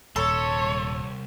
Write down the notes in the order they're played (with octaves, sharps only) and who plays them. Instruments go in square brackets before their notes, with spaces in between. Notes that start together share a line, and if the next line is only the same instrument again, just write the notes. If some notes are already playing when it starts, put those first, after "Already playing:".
[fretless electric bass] D#1 [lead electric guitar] C2 C6 [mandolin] A4 [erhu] C#5